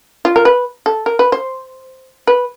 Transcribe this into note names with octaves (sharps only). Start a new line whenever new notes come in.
F4
A#4
B4
A4
A#4
B4
C5
B4